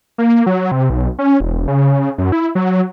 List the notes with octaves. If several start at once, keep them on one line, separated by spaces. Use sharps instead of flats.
A#3
F#3
C3
B1
C#4
E1
C#3
F#2
E4
F#3